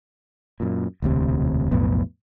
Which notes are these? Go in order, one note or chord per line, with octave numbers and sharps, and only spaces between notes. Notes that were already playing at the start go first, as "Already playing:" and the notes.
F#2 A#2
E1 D2 C3
B1 F2 A2 B3